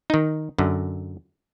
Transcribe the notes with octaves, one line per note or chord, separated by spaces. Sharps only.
D#3 D#4
F#2 D3